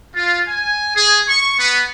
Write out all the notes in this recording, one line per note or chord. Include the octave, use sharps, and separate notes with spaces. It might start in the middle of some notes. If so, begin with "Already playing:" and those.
F4
G#5
G#4
C#6
B3